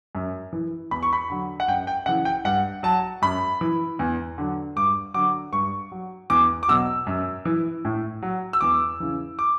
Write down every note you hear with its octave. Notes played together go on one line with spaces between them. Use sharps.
F#2
E3
E2 B5
C#6
B5
D3 F#3
F#5
F#2 G5
G5
C#3 E3 F#5
G5
G2 F#5
F#3 A5
F#2 B5
E3
E2
D3 F#3
G2 D6
D3 F#3 D6
G2 C#6
F#3
E2 D6
D6
B2 F#3 E6
F#2
E3
A2
F#3
E6
E2 D6
C#3 E3
D6